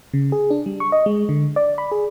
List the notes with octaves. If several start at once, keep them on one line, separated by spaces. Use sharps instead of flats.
C#3
G#4
D4
G3
C#6
D#5
G#3
D3
D5
B5
G#4